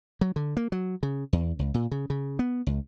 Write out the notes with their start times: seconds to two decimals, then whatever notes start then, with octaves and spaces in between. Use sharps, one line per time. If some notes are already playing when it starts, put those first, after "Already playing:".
0.21 F#3
0.36 D3
0.57 A#3
0.72 F#3
1.03 C#3
1.33 E2
1.59 C#2
1.74 A#2
1.91 C#3
2.10 C#3
2.39 B3
2.67 C#2